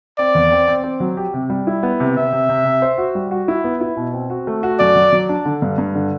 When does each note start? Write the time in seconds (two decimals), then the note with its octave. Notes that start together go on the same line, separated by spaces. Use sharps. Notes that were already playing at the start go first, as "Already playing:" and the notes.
0.18 C4 D5
0.35 E2
0.52 C4
0.68 C4
0.84 C4
1.00 F#3
1.17 G4
1.34 C3
1.50 G3
1.67 E4
1.83 B3
2.00 C3
2.16 C3 E5
2.33 C3
2.49 C3
2.65 C3
2.82 C5
2.98 F#4
3.15 G3
3.31 F#4
3.48 E4
3.64 B3
3.81 E4
3.97 B2
4.14 C4
4.30 F#4
4.47 A3
4.63 F#4
4.79 F#2 D5
4.96 F#3
5.12 F#3
5.29 D4
5.45 D3
5.62 G2
5.78 G2
5.95 D3